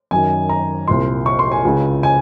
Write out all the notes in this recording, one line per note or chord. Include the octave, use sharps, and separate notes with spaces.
F#2 D#3 G#5
A#5
C2 A#2 C6
C#6
C6
G#5
C#2 C#3
G#5